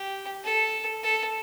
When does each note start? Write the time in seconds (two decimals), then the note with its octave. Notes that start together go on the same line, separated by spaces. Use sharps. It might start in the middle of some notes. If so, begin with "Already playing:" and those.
Already playing: G4
0.44 A4
1.03 A4